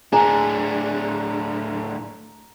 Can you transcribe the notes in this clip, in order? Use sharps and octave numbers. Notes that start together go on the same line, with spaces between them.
A2 D4 G#4 A#5